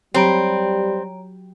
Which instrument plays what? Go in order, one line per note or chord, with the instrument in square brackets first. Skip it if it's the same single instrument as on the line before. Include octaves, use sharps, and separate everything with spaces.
[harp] F#3 G4 B5 [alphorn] G3 [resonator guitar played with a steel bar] C4 [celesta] C#5 A#5 D7